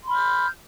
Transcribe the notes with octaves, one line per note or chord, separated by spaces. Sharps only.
B5 C6 F6 G6